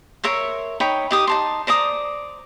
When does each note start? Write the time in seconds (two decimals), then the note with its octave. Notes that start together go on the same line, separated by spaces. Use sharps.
0.24 A#4 C#5 E5 C6
0.80 D#4 C#5 G5 B5
1.11 D#4 G4 D#6
1.27 D#4 A5 C6
1.67 C5 D5 A#5 D#6